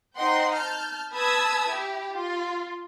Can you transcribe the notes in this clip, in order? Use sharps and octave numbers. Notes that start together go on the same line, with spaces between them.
D#4 C5 D#5 F#5 G5 C6
A5 F6 G6
B4 A5 B5 D#6 E6 G#6
E4 G4
F4